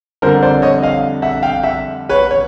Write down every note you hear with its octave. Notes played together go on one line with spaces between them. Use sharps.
F2 D3 G3 A#4 C5
C5 D5
C#5 D#5
D#5 F5
E5 F#5
F5 G5
E5 F#5
B4 C#5
C#5